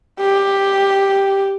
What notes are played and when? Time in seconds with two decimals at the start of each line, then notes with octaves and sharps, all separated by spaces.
0.20 G4